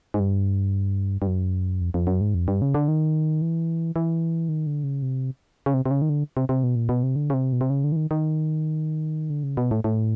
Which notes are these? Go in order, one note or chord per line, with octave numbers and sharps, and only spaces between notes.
G#2
G2
G2
F#2
F2
F2
F#2
G#2
F2
G2
C#3
D3
D#3
E3
E3
D#3
D3
C#3
C3
C#3
C3
C3
C#3
D#3
D3
C3
C3
B2
A#2
B2
C3
D3
C#3
C3
B2
C3
C#3
D3
E3
D#3
D#3
D3
C#3
B2
A2
A2